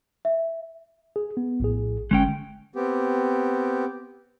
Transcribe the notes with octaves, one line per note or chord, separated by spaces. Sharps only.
E5
G#4
B3
A#1 A2 G#4
G1 D3 G#3 C#4 G5
B3 C4 G4